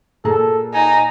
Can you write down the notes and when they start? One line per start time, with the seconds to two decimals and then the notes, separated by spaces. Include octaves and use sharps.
0.25 A#2 G#4 A4 A#5
0.74 D#4 G#5